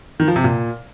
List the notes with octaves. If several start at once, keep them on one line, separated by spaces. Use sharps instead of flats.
D#3
F3
C3
A#2